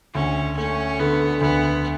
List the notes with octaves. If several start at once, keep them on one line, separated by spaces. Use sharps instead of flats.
D2 C#4
A3 C#4
D3 B3
D2 B3